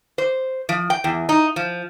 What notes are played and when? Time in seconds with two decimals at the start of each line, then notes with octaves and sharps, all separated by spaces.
0.18 C5
0.69 F3
0.90 G5
1.04 E2
1.29 D#4
1.56 F3